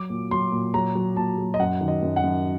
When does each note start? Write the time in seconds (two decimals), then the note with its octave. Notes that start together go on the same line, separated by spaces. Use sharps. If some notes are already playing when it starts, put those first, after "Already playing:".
Already playing: F#3 D6
0.10 A#2
0.31 F#3 C6
0.52 A#2
0.74 F#3 A#5
0.95 F#3
1.17 A#2 A5
1.38 F#3
1.54 D#5
1.59 F#2 F#5
1.81 D#3
1.88 D#5
2.03 F#2
2.16 F#5
2.23 F#2